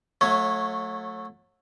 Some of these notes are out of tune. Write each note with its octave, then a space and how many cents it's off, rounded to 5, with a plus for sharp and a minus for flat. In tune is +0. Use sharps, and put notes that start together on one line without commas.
F#3 -30 A3 +0 C#5 -5